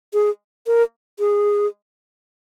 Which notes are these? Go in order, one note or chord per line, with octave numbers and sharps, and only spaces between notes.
G#4
A#4
G#4